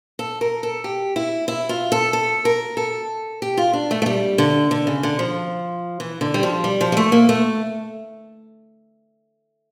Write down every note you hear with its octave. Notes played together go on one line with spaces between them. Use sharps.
A4
A#4
A4
G4
E4
E4
F4
A4
A4
A#4
A4
G4
F4
D4
A3
A3
G3
D3
D3
C#3
D3
F3
E3
D3
G3
F3
G3
F3
G3
A3
A#3
A3